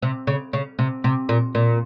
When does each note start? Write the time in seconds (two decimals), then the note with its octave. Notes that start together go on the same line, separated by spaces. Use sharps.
0.02 C3
0.27 C#3
0.53 C#3
0.79 C3
1.04 C3
1.29 A#2
1.55 A#2